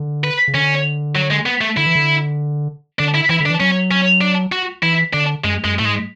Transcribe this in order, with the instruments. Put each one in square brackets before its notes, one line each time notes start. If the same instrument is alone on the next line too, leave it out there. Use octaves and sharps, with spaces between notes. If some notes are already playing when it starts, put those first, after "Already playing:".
Already playing: [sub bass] D3
[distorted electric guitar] B4
[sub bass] C#3
[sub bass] D3 [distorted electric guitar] C#4
[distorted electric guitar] F#3
G#3
B3
A3
[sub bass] D3 [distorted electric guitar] E4
[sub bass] E3
D3
[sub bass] D3 [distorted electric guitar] D4
[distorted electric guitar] E4
[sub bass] E3 [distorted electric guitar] E4
[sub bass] D3
[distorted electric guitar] D4
[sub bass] E3
[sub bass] F#3 [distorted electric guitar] C#4
[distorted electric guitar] C#4
D4
F#4
[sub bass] E3 [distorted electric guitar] E4
[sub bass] D3 [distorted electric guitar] D4
[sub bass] F#2 [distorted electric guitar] G#3
[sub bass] F#2 [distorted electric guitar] G#3
[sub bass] A2 [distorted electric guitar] A3
[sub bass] G#2 [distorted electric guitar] G#3